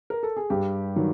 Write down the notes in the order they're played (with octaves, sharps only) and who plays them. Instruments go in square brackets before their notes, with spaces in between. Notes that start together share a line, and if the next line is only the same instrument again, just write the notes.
[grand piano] A#4
A4
G#4
G2 G4
D#3 F#3